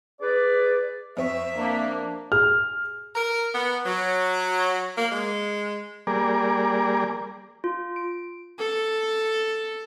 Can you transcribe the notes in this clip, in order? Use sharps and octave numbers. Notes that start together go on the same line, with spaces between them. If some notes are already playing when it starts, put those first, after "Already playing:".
G#4 B4 D5
F2 C4 E5 C#6
A#3 D4
G#4 F6
A#4
B3
F#3
A#3
G#3
G3 A#3 G#4 A#4 D5
F4
D7
A4